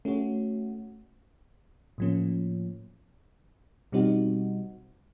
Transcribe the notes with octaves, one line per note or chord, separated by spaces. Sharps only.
A3 C#4 F#4
A2 F3 A#3 C#4
B2 G3 C4 D#4 F#4